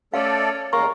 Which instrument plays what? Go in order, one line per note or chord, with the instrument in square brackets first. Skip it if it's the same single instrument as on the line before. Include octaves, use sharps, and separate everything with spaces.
[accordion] A3 A4 D5 [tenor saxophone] C#4 [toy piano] F5
[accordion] E2 G#3 [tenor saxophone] A#3 [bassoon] A#4 [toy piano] C#6